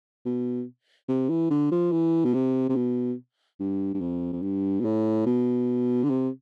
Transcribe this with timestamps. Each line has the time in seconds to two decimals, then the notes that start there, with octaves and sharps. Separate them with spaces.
0.26 B2
1.08 C3
1.29 E3
1.50 D3
1.71 F3
1.92 E3
2.24 B2
2.34 C3
2.69 C3
2.75 B2
3.60 G2
3.94 G2
4.01 F2
4.33 F2
4.42 G2
4.80 B2
4.85 A2
5.26 B2
6.03 D3
6.10 C3